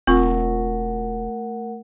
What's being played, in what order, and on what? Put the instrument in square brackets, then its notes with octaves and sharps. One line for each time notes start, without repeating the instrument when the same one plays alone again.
[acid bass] E1 [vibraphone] A3 A#4 F#5 [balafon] C4 [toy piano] F4 C#6 E6